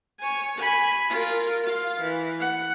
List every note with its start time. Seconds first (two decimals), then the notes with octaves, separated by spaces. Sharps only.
0.20 C#5 G#5
0.59 G#5 B5
1.10 F4 A#4
1.64 F4 F5
2.01 E3
2.41 F#5